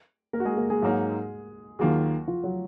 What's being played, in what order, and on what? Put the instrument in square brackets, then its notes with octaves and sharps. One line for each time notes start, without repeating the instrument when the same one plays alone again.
[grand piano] A#3 A#4
F#4
G#3 G#4
A#3 A#4
G#3 G#4
[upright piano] G#2 F#3 A#3 D#4
[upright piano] D#2 D#3 A#3 F4 G#4 [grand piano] F#3 F#4
[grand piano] F3 F4
F#3 F#4